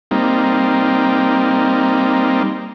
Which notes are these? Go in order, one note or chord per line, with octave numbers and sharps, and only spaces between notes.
G3 A#3 C4 D#4